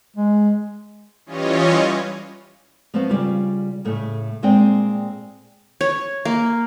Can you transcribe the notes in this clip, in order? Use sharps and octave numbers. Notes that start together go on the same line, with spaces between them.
G#3
E3 G3 C#4 F4 C#5 D#5
F3 A3 B3 C4 B4 F5
C#3 G3 F4
A2 C#3 A3
A#2 G#3 C4 C5 D5 G5
C#5
A#3